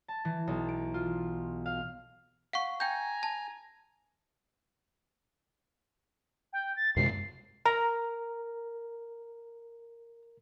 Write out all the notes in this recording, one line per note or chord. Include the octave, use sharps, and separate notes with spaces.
A5
E3
B1
D7
F4
F5
F5 F#5 C#6
G5 G#5 A#5 G6
A5
G5
A6
F#2 C3 G#3 C7
A#4 A#5